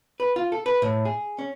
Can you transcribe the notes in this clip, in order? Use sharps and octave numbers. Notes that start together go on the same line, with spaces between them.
B4
F4
A4
B4
A2
G#4
C#4